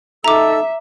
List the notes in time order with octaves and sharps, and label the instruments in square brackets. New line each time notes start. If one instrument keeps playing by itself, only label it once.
[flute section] D#4 A4 E6 [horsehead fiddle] E5 [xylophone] A#5 D6